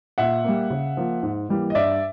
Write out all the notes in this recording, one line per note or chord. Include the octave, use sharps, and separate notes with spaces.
A#2 E5 F#5
G3 A#3
C#3
F3 A#3
G#2
E3 G3 A#3
D#5
G2 D5 E5